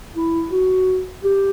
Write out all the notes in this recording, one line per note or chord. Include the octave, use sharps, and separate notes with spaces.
E4
F#4
G4